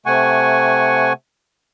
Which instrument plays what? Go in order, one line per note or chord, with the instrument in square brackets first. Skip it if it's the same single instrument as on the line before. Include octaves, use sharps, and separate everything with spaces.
[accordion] C3 A3 F#5 G#5 C#6